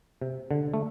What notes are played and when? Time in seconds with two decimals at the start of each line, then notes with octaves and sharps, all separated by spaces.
0.21 C3
0.51 D3
0.74 A3